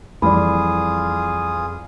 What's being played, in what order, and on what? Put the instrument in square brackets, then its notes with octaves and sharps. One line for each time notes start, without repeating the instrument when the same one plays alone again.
[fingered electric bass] F2 [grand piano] E3 G3 [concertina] F4 G#4 D#6 [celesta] D5 B5